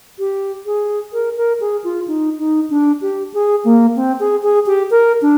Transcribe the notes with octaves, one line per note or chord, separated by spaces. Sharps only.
G4
G#4
A#4
A#4
G#4
F4
D#4
D#4
D4
G4
G#4
A#3
C4
G#4
G#4
G4
A#4
D4